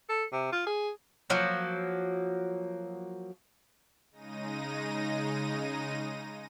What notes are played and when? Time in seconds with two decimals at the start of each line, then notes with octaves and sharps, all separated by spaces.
0.09 A4
0.32 C3
0.52 F4
0.66 G#4
1.30 F3 F#3 A#3
4.12 C#3 G#3 D#4 A#6 D#7